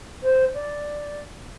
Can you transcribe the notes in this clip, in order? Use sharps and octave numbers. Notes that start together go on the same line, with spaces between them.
C5
D5